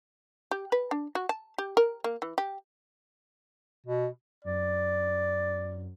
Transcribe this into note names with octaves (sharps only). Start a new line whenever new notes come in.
G4
B4
D4
F#4
A5
G4
A#4
A#3
E3
G4
B2
F#2 D5